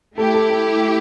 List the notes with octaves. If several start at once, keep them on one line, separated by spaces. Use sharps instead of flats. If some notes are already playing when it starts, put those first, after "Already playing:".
A3 E4 G4 A4
A4
A4